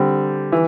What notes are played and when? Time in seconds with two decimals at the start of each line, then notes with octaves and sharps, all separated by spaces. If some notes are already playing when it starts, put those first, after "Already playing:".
Already playing: D3 G3 C4
0.52 E3